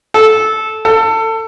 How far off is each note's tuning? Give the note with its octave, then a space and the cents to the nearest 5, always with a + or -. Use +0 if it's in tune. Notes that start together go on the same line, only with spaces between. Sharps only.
A4 -15
A4 +25